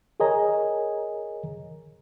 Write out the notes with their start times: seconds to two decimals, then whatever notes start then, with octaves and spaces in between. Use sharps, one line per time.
0.20 G#4 A#4 C#5 D#5 G#5 A#5